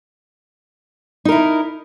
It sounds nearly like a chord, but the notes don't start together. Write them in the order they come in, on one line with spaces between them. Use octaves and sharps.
D#4 A#4 E4